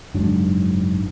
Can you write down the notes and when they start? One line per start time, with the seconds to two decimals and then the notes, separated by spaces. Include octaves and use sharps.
0.14 F#1 G#2 F#3 D4